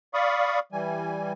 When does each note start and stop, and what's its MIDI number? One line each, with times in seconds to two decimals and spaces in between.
0.14 0.59 74
0.14 0.59 77
0.14 0.59 83
0.14 0.59 85
0.14 0.59 87
0.72 1.33 52
0.72 1.33 55
0.72 1.33 80